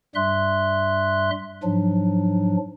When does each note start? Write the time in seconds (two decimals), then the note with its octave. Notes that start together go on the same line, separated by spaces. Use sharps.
0.15 G2 G3 E5 C6 F#6
1.63 G#2 F3 F#3 D4